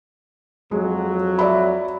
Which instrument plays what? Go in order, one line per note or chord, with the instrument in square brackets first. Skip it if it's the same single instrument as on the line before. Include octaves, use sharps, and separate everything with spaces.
[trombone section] F2 F#3 [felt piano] G#3
[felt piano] D5 E5 B5